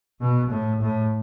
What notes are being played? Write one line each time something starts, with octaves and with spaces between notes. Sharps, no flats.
B2
A2
A2